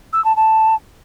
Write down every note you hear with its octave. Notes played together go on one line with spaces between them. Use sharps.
E6
A5
A5